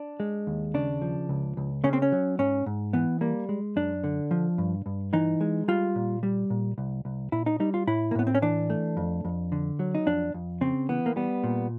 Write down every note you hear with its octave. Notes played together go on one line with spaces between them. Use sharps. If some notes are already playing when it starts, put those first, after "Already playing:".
Already playing: D4
G#3
D#2
C#3 D4
F3
C#2
C#2
C#3 C#4
C4
C#4
F#3
G#2 C#4
G#2
E3 B3
G3 A#3
G#3
F#2 D4
D3
F3
G2
G2
E3 D#4
G#3
G3 F4
A#2
G3
A#2
C2
C2
A#2 E4
D#4
G3 D#4
F4
A2 E4
A#3
A2 B3
C4
C#4
E3 D4
A3
F2
F2
D3
F#3
D#4
F2 D4
F2
C#3 C4
E3 B3
A#3
G3 B3
A#2